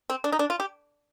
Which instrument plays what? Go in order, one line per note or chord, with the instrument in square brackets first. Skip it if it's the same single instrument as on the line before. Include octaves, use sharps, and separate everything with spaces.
[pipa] C4
D4
D#4
D4
F4
G4